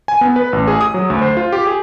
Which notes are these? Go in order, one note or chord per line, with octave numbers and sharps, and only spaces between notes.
G#5
B3
B4
A1
G#4
D#6
F#3
D2
C5
F4
G4
G#4